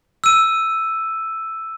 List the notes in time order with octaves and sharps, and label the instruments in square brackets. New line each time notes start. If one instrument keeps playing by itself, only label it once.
[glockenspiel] E6 D#7